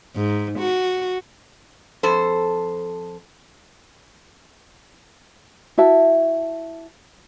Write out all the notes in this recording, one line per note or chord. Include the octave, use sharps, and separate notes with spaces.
G#2
F#4
F2 A4 C5
E4 F#4 E5 A5